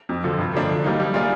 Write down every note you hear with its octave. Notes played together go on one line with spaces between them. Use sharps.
F2
D3 F3
G2
D3 F3 A#3 D4
D3
G3 A#3 D#4
G3
A#3 F4 G#4 D5